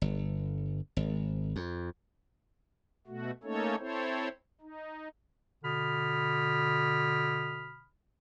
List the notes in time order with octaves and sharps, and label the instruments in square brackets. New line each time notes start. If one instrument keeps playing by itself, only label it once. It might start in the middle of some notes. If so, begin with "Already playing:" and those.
[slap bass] G1
G#1
F2
[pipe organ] B2 A3 F#4
A3 A#3 C#4 D#4 A4 C#5
C4 E4 A4 C5 C#5
D#4
[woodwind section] B2 D3 B5 D#6 F6